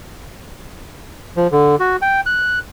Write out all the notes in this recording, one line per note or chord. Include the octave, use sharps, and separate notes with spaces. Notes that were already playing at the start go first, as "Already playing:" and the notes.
F3
D3
F#4
G5
F#6